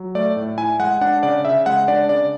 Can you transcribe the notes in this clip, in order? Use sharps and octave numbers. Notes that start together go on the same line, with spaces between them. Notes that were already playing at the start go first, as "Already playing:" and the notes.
Already playing: F#3
A3 D5
A2
E4 G#5
G#3 F#5
D4 F#5
C#3 D5
C#3 E5
G#3 F#5
D4 D5
C#3 D5